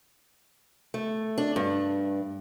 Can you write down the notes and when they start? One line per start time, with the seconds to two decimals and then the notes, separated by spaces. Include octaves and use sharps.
0.94 A3
1.38 D4
1.56 G2